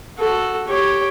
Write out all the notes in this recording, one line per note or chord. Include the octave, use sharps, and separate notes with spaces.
F#4 A4
G4 C#5